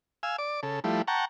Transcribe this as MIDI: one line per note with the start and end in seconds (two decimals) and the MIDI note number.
0.23 0.36 77
0.23 0.36 80
0.23 0.36 88
0.39 0.60 74
0.39 0.60 86
0.63 0.80 49
0.63 0.80 69
0.84 1.02 53
0.84 1.02 55
0.84 1.02 57
0.84 1.02 64
1.08 1.25 78
1.08 1.25 79
1.08 1.25 81
1.08 1.25 82
1.08 1.25 85